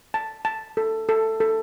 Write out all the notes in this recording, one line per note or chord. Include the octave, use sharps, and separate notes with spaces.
A5
A5
A4
A4
A4